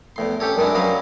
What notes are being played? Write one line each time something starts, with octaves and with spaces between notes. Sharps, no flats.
E2 A2 C6
C#4 G4 A4 C#5
F#2 D#3 G#3 D4 E4
F#3 C#4 B4 D#5 F5